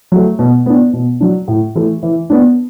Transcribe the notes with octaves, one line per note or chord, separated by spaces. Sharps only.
F#3 A3
B2
B3 D4
B2
F#3 D4
A2
E3 A3 E4
E3
B3 D4